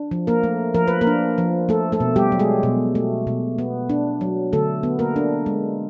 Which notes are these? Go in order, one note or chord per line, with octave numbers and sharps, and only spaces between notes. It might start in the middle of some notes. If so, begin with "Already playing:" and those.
Already playing: D4
F3
A#3 A#4
A3
F3 A#4
B4
A#3 A#4
D4
F3
A3 A4
A3 A4
B2
G3 G4
F#3
G#3 G#4
B2
A3
B2
B3
D4
F#3
D3 A3 A4
B3
A#3 A#4
D4
G#3